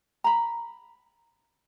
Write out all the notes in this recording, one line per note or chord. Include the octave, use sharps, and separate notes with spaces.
A#5 B5